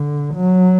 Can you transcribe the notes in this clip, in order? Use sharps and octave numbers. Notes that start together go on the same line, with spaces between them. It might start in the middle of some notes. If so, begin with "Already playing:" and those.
Already playing: D3
F#3